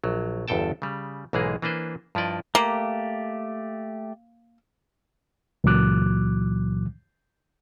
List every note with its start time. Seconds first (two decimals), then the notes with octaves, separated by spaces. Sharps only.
0.04 A#1 F#3
0.48 G1 E2 G2 A4 G5 A5
0.82 C#3 G3
1.33 B1 G#2 E3 G#3 A#3 G#4
1.62 E3 A#3 D4 B4 C5
2.15 G2 F3 E4 D5 D#5
2.55 A3 A#3 G4
5.64 C#2 A#2 E3 F#3 D6 F#6